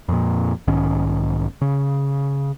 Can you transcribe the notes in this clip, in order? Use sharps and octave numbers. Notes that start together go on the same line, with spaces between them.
F2 A#2
B1 G#2 D#3 C#4
C#3